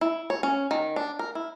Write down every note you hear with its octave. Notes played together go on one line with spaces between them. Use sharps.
E4
C#5
C#4
D#3
D4
A#4
E4